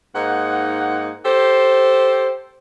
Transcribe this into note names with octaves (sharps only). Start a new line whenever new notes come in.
G#2 A#3 D#4 F#5
G4 A4 C5